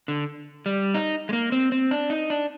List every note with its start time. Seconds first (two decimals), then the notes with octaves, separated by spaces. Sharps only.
0.08 D3
0.66 G3
0.94 D#4
1.29 G#3
1.33 A#3
1.52 C4
1.72 C4
1.91 D4
2.10 D#4
2.30 D4